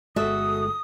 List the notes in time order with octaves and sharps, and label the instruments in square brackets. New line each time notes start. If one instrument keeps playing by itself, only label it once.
[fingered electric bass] G1 G#3 [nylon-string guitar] F#4 A4 E5 [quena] D#6